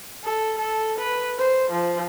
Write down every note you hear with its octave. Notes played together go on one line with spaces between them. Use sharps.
A4
A4
B4
C5
F3